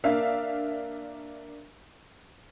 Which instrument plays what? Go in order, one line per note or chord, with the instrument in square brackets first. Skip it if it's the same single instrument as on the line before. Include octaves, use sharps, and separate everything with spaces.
[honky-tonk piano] A#3 D4 E5 F5